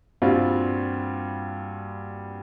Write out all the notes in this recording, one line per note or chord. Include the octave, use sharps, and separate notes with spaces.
G2 A#2 G3 C4 F4 F#4